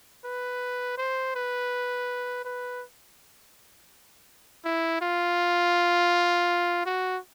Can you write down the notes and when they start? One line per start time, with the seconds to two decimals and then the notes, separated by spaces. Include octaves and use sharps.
0.25 B4
0.98 C5
1.35 B4
2.45 B4
4.65 E4
5.01 F4
6.86 F#4